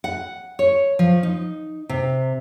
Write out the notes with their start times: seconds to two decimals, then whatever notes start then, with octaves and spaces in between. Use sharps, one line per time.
0.04 F#5
0.59 C#5
0.99 F3
1.23 D#4
1.89 C3